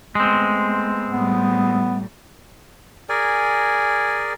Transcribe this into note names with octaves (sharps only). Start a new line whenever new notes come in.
G#3 A3 B3 C4
A2 G3 B3
G#4 A#4 D5 G#5